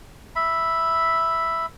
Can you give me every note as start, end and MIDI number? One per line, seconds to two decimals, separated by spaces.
0.36 1.66 76
0.36 1.66 83